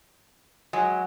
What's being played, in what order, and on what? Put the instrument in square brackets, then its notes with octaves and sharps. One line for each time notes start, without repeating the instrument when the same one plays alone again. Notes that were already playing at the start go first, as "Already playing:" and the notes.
[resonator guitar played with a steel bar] F#3 [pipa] G#3